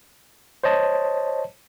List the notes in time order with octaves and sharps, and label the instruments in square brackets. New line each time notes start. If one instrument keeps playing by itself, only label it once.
[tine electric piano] C5 C#5 D#5 A5